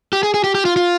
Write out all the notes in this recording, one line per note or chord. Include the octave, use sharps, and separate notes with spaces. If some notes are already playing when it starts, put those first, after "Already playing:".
G4
G#4
G#4
G4
G4
F4
F4